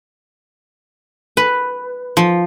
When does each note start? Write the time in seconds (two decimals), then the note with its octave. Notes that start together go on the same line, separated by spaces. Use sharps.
1.37 B4
2.17 F3